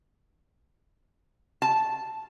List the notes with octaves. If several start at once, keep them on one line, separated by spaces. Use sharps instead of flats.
A5